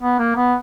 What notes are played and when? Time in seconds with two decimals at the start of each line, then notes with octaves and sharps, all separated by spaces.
0.02 B3
0.19 A#3
0.36 B3